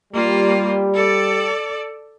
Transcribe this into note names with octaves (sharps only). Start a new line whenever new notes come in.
G3 A#3 F4
A4 D5